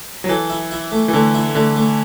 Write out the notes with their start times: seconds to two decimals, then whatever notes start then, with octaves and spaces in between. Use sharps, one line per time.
0.24 F#3
0.29 E3 A4
0.50 E4
0.71 E4
0.92 A3
1.08 E3
1.13 D3 A3
1.34 E4
1.55 D3 A3
1.76 A3